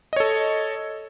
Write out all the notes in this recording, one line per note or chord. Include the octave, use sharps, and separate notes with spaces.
A4 C#5 D#5